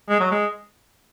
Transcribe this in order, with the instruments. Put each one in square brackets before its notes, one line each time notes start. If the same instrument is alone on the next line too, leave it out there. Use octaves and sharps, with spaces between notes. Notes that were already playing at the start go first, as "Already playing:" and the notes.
[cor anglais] G#3
F#3
G#3